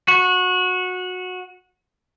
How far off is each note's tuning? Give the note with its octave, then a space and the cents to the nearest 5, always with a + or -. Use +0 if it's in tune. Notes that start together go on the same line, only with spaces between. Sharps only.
F#4 -20